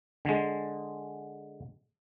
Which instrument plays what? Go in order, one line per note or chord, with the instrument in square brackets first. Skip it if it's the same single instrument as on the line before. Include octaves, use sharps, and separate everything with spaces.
[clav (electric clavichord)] D3 G#3